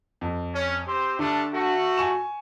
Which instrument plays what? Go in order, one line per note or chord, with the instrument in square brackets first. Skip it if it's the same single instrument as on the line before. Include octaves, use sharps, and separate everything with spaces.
[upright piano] F2
[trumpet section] C#4
C4 G4 C5
[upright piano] D3 [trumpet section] G3 A3 D4
[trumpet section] A3 F#4
[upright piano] G#5 C#6 E7